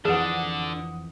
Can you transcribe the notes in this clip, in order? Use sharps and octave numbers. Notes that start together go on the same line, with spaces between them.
F2 D3 E3 G#4 F#5 D#6